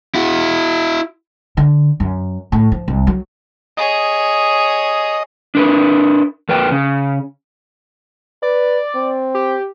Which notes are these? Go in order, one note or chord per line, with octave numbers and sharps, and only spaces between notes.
E4 F#4
D3
F#2
A2
F3
C2
F#3
G#4 C#5 D#5
D4 A#4 B4
F2 A#4 B4 G5
C#3
B4 D5
C4
G4